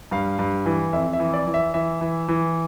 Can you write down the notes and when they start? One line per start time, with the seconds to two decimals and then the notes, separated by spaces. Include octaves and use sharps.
0.11 G2 F5
0.39 G2
0.66 E3
0.93 F2 E5
1.13 E5
1.20 E3
1.33 D5
1.47 E3
1.54 E5
1.74 E3 E5
2.01 E3
2.28 E3